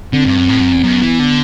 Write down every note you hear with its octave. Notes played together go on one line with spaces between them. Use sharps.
D3 C4
G2
F#2
A2
F#2
E2
F#2 B3
E3
D3